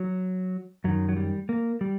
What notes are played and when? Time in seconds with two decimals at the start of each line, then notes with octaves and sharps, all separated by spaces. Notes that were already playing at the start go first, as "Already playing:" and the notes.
Already playing: F#3
0.84 F#2 D#3 F#3
1.09 F#3
1.16 G3
1.49 A#3
1.81 G3